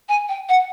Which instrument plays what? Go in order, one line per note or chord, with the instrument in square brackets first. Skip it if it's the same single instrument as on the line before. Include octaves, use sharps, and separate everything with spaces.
[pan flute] G#5
G5
F#5